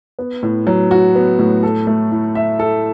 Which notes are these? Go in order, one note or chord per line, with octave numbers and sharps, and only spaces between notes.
B3
A2
F#3
F#4
B3
A2
A4
A3
E4
E5
A4